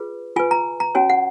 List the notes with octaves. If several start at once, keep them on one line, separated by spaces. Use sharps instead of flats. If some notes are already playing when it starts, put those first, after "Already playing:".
Already playing: F4 G#4 B4
F4 B4 G#5
A#5
A#5
C#4 F#4 C#5 G#5
F#5